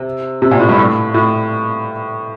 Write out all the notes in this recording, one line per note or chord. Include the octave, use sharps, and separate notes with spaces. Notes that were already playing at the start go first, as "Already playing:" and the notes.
Already playing: C3
C3
A#2
A2
G2
A2
A2